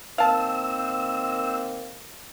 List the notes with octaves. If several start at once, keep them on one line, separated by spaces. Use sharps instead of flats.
D#3 A#3 C4 F5 A5 E6